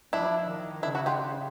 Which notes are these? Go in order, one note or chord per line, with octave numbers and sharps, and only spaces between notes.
F3 D4 E4
D#3
C#3 D4 E4
E4 F#4
F4 G4